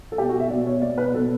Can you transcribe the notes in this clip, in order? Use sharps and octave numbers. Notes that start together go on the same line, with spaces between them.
A4
B2 G4
F#4
E5
B2 D5
C#5
B2 D5
B4
B2 A4